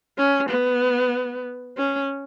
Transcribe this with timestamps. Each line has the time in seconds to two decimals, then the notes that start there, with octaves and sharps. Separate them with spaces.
0.18 C#4
0.50 B3
1.78 C#4